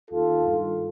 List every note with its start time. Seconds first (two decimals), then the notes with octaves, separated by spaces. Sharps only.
0.10 D#2 D#3 F4 A4
0.45 G2 D#3